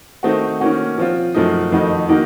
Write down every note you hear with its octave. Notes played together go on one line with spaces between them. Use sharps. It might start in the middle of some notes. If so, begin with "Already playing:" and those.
D#3 A3 C4 D#4 F#4
D#3 A#3 C#4 F#4
F3 C4 F4
F#2 F3 A3 D#4
F2 D#3 A3 D#4 F#4
D#3 A#3 D#4 F#4